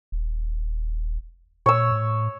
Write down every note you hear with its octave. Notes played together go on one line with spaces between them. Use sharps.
D#1
A#2 C#5 E6
A2